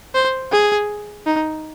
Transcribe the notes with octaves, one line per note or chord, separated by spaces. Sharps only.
C5
G#4
D#4